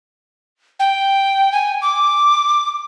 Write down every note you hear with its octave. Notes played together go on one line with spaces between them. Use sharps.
G5
G#5
D6